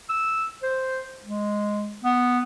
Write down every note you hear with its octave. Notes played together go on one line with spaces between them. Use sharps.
E6
C5
G#3
B3